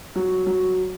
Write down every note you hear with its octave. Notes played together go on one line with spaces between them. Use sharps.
F#3
F#3